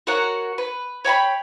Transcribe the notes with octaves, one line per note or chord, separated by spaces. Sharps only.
F#4 A#4 C#5 F#5
B4
C#5 G5 A#5 B5